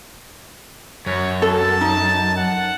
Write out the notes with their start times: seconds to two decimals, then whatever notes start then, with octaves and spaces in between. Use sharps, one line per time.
1.06 F#2 C#5
1.42 A4 A5
1.81 D#4
2.37 F#5